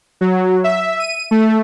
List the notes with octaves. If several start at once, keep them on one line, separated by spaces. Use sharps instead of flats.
F#3
E5
D#7
A3